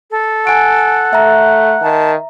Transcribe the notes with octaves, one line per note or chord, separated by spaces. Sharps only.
A4
F#5 G#5 D7
A3 E5 A#5
D#3 A5